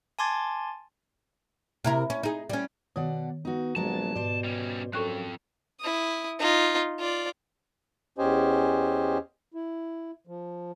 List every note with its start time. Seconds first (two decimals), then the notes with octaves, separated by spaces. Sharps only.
0.19 G#5 A5 C6 D6 G#6 A6
1.84 C3 E4 A#4
2.10 C#4
2.23 D#4 G#4
2.49 G3 C#4
2.96 B2 D#3 D5 F#5
3.45 B3 D#4 F#4
3.76 A#1 F#3 G#3 B3 A5
4.15 G#2 B2 C5 D5
4.44 G3 C#4
4.93 F#2 F3 C4 A4 C#6 F#6
5.80 E4 D#6
6.39 D#4 F4
6.99 F4 D5
8.18 E2 C#4 G4 C5 D#5 G#5
9.54 E4
10.27 F3